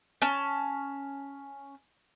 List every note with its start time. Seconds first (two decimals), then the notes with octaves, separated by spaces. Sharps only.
0.22 C#4 A5